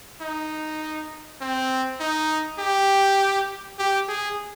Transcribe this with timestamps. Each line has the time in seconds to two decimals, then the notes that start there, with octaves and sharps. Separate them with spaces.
0.21 D#4
1.41 C4
2.00 D#4
2.59 G4
3.79 G4
4.09 G#4